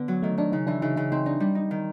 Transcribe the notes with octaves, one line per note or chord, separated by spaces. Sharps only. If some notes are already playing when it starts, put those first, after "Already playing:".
Already playing: D3 B3
F#3
D#3 A3
D#3 D4
C#3 D#4
E3 D4
C#3 D#4
C#3 D#4
C4 D#4
D4 D#4
G3 D4
D#4
D#3